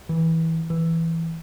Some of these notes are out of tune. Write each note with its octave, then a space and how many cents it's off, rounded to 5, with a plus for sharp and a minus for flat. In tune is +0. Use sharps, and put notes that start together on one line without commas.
E3 -20
E3 +0